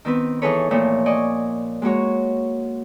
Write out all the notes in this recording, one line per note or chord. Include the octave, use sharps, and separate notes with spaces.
D#3 B3 C4 B4
E3 D#4 G#4 A4 B4 C#5
A#2 E3 F3 A3 C#5
D5 D#5 G#5 C#6
G#3 A#3 F#4 C#5